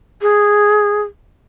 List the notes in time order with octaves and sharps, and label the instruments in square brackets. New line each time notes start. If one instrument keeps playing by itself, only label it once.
[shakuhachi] G#4